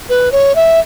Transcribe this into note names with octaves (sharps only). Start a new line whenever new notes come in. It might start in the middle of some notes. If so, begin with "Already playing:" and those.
B4
C#5
E5